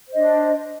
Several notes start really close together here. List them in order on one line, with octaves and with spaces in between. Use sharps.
C5 D#5 D4